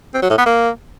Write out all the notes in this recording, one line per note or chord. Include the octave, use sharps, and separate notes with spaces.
C4
F#3
A2
B3
A#3